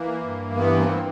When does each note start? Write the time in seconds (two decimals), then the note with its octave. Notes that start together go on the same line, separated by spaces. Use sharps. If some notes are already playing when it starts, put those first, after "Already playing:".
Already playing: E3 A#3
0.24 G2
0.56 E3 B3
0.78 A#3 C4
0.89 E3